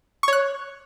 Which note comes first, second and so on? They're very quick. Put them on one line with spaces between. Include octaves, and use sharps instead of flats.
C#6 C#5 F#6